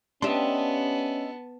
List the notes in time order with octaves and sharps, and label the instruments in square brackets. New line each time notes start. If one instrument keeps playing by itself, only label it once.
[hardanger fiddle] B3 A5 [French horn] C#4 [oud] D4 G4 [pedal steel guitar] D#5 E5 C6